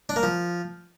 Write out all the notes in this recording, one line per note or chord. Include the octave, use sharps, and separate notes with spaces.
D4
A#3
F3